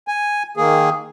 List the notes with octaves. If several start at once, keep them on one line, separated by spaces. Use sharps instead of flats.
G#5
D#3 A#3 G#4